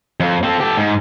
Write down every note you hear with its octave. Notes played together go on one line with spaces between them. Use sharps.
F2
C4 A4
G4 A4
G#2